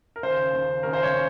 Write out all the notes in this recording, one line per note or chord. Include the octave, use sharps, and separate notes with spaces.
A#4
D#2 C#3 C5
D#2 C#3
D#2 C#3 A#4
C5
C#5
C#3